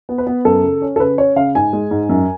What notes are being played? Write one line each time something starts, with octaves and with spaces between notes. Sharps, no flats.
B3
B4
B3
F#2 A4
C#3
C#4
A4
C#3 B4
C#4 C#5
C#3 F5
G#2 G#5
G#3
G#2
F#2